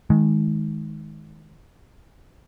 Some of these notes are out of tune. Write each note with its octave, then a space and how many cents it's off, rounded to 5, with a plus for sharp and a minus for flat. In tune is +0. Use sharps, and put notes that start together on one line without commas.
D#3 +10 G#3 +15